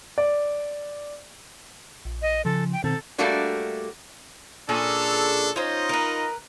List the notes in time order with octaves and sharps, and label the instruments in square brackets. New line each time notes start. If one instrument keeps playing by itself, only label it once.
[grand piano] D5
[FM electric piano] A#1
[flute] D#5
[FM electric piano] C#3 F3 [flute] A4
[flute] G5
[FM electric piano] B2 D#3 C4 [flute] A4
[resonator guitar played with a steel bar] G3 A3 A#3 D4 F#4 D5
[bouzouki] A#2 C#4 G#4 [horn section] D4 A4
[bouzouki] C#4 C5 [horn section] D#4 F4 D#5
[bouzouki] A#4 B4